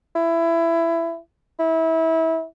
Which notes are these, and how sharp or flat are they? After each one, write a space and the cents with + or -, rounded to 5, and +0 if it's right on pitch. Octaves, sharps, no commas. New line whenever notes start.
E4 +20
E4 -25